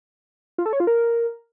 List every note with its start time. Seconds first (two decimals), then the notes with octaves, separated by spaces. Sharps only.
0.58 F4
0.66 A4
0.73 C#5
0.80 F4
0.87 A#4